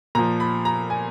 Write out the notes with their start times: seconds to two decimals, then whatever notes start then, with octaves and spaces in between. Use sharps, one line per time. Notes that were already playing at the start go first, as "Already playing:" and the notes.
0.15 A#2 F3 A#5
0.40 B5
0.65 A#5
0.90 G#5